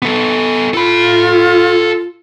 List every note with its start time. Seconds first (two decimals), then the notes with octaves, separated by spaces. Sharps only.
0.02 B3 A4
0.74 F4 A4 B5